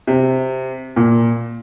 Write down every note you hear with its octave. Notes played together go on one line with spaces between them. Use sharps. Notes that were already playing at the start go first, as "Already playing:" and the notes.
C3
A#2